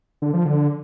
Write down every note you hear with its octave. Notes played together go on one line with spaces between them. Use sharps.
D3
F3
D3